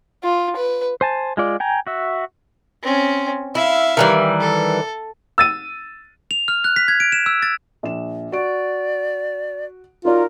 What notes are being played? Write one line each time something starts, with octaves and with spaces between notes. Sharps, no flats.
F4
B4
C5 G#5 A5
G#3 F4 D5
G5 G#5 A#5
F#4 E5
C4 C#4
E4 E5 F5
D#3 E3 G3
A4
E6 A6 D#7
F7
F6
F#6
B6
G#6
D7
E7
E6
A6
A#1 E7
F#4 D5 D7
D#4 F4 F#4 A#4 D5